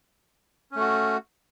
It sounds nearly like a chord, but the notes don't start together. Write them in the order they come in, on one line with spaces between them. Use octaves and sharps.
C#4 A3 F#4